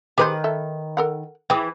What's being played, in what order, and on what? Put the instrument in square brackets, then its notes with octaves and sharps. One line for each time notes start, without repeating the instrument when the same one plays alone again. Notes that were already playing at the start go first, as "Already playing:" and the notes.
[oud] D#3 B4 [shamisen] G4 G#4 C5
[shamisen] A4 E5
A4 A#4 F#5
[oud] E3 [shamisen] G#4 G5